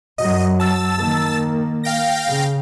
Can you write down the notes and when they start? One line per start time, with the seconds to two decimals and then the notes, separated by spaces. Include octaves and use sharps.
0.18 F#2 F#3 D#5
0.60 A5 E6 A6
0.98 D#3 A#3
1.83 F5 G5 A#6
2.27 C#3